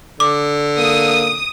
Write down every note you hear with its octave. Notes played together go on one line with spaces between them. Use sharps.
D3 D6
A#3 D#6